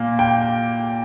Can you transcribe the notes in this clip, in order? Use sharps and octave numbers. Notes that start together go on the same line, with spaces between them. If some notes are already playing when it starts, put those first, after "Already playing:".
Already playing: A#2 A#3
G5